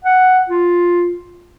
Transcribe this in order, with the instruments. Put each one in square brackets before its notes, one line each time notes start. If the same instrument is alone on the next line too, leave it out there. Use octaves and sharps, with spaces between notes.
[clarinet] F#5
F4